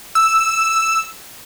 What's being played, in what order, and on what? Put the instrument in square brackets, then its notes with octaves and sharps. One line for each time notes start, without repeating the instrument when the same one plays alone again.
[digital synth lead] E6